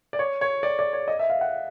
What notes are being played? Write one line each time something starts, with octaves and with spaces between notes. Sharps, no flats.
D5
C#5
C#5
D5
D5
C#5
D#5
E5
F5
F#5